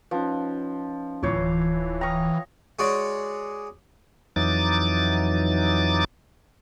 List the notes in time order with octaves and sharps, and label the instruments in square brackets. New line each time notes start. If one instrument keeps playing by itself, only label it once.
[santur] F3 [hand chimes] C#4 D#4 B4
[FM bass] D1 [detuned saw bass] E3 [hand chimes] F4 G6 C7 [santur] C#5 D6
[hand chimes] G5 D#6 F6 [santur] A#5 C#6
[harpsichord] G#3 F#4 C#5 D5
[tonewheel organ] F2 E3 F#3 D#4 D6 A6